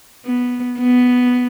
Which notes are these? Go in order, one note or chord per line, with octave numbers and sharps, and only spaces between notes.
B3
B3